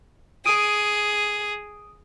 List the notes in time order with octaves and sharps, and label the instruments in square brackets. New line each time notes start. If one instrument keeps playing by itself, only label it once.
[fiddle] G#4 [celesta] D#6 D7 D#7